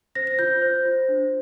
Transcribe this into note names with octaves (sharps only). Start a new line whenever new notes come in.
C5 A#6
A#6
F4 G6
C5
F4
D4